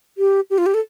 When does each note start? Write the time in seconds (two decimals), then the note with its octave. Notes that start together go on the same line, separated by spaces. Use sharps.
0.18 G4
0.50 G4
0.58 F4
0.66 G4
0.74 A4